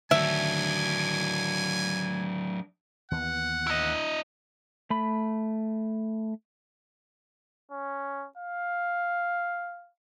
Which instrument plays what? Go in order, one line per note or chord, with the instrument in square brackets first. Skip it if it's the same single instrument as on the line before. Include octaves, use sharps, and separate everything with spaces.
[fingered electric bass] D3 D#3 A3 [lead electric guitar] F#3 D4 [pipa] E5 [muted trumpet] G#5
[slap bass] D#2 E3 B3 [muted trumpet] F#5
[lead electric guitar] E4 D#5
[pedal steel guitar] A3 B5
[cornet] C#4
F5